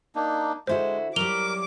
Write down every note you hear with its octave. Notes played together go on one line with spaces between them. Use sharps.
A#3 D4 D#4
D3 G#3 E4 F#4 C5
F#3 G3 A#4 D6 F7 G7